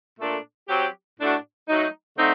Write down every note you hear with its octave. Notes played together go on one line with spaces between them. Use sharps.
A#2 A3 D4 A4
F#3 C4 G4
A2 A3 D4 F#4
F#3 A3 D#4
D3 A3 C4 D#4